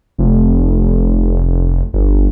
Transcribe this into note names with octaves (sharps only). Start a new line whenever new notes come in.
F1
G1